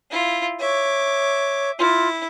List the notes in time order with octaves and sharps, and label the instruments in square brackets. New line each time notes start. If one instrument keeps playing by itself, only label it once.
[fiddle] E4 F4
[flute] C#5 [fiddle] E5 D6
[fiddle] E4 [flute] F4